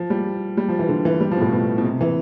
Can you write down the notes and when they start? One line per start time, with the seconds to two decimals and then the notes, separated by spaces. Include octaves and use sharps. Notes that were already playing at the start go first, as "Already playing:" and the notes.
Already playing: F3
0.10 G3
0.57 G3
0.68 F3
0.79 E3
0.89 D3
1.05 E3
1.20 G3
1.31 F3
1.37 B2
1.41 A2
1.53 B2
1.78 B2
1.84 C3
2.01 E3